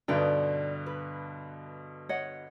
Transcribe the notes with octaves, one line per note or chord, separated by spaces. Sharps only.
G2 B2 D3 D#4 D5 G5
B4
C#5 D#5 F#5